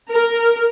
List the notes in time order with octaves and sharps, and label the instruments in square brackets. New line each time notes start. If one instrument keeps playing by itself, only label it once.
[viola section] A#4